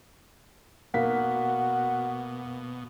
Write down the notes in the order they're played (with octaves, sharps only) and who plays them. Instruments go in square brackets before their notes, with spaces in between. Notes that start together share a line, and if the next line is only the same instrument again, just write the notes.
[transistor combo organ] B2 [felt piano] A#3 F5 B6 [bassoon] F#4